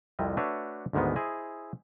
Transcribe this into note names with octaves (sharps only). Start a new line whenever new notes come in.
C2 F2 C3 G3 D#5
A3 D4 F#4 A4 B4 C#5
D2 G#2 D#3 G#3 B3
E4 G#4 C5 D#5